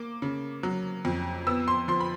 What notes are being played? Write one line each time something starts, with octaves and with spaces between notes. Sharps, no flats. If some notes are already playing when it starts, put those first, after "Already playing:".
Already playing: A#3 D6
C#3
F#3
F2
B3 E6
C6
F3 C6
B5